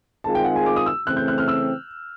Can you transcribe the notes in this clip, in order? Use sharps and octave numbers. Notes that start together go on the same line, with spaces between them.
D#3 G#3 C4 F4 G#4 A5
G5
F#5
G#5
D6
D#6
E6
C#3 E3 A3 C4 F#6
G6
F#6
F6
E6